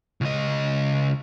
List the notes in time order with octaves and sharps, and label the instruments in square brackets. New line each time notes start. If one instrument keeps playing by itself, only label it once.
[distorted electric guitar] C#2 D#5